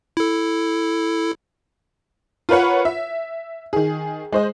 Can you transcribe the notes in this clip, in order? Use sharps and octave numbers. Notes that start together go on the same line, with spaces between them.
E4 A4
F4 A#4 B4 C#5 F#5
E5
D#3 G#4
G#3 C5 D#5